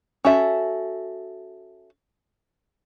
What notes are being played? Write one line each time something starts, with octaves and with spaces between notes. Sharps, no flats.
C#4 F#4 A4 E5